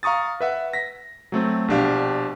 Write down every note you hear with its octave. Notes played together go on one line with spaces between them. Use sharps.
F5 A#5 C#6 D#6 A6
B4 E5 F#5
A#6 B6
F#3 A3 C4
A#1 B2 D4 G4 F5